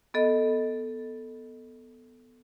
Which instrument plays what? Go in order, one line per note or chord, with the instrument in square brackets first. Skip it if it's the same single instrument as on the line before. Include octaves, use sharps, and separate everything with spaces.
[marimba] B3 A4 D#5